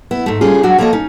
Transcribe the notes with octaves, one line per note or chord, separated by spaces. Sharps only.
B3 E4
G#2 A3
G3 C#4 F4 G#4
F#3 G#3 B3 D4 F#4
F3 A#3 A4 A#4 C#5 D#5
C#4 D#4